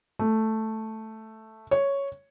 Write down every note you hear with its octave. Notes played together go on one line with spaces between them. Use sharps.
A3
C#5